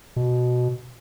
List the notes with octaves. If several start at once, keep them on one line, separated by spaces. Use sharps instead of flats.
B2